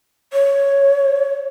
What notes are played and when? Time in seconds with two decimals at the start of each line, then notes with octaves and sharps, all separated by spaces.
0.33 C#5